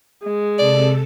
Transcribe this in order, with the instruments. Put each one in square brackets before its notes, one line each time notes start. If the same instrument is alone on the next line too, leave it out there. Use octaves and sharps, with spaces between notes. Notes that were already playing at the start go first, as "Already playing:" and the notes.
[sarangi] G#3
[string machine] C3 A4 A5 [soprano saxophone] D5